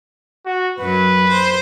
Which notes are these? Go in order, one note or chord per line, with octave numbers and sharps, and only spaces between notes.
F#4
F#2 F#3 B4
C5